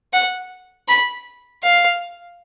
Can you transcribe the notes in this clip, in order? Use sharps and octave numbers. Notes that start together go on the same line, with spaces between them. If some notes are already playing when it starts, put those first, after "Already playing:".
F#5
B5
F5